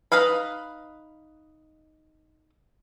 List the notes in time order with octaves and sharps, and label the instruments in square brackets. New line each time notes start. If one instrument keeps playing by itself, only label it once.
[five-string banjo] D#4 B4 D#5 F5 B5